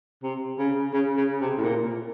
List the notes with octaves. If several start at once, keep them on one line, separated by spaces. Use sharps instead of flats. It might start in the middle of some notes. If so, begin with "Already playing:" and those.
C3
C#3
C#3
C#3
C3
A2
A#2